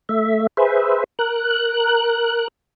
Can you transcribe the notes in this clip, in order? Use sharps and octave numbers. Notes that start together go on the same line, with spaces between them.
A3 E5
G#4 B4 C5 E5
A#4 F#6